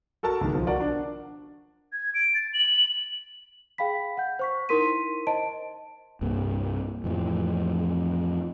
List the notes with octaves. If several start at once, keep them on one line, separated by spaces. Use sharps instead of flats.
F#4 A4 A#4 A5
C#2 D#3
B1 F3
F#4 A#4 D5 F#5
D4
G#6
D7
A6
F#7
G#4 F5 G5 B5 B6
F#5 G6
C5 C#6 B6
D#4 E4 A#4 C6 B6 D#7
C5 D#5 A5 D7
C2 G2 G3 A#3
F2 A2 E3 F3